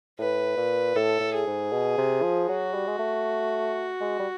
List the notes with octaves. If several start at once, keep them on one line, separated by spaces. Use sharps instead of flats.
A2 B4
A#2
A2 A4
A2
G#4
G#2
B2
C3
F3
F#3 F#4
G3
G#3
A3
G#3
G3